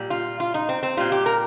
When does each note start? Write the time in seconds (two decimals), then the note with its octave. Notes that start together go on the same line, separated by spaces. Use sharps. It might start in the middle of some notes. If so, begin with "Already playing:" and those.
Already playing: A#2 G3
0.10 F4
0.40 F4
0.54 D#4
0.69 C4
0.83 C4
0.97 A#2 G3 F4
1.12 G4
1.26 A#4